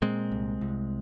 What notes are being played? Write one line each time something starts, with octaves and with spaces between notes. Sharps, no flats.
A#2 G#3 C4
C2
C2